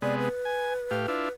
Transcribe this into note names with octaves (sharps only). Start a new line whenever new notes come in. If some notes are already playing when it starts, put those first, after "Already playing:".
C3 G#3 B3 D5
B4
G#5
A2 G4 F5
D4 E4 F4